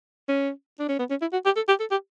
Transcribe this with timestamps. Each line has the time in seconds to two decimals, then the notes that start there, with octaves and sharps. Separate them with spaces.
0.29 C#4
0.79 D4
0.89 C#4
0.99 B3
1.10 C#4
1.21 E4
1.32 F#4
1.45 G4
1.56 A4
1.68 G4
1.80 A4
1.91 G4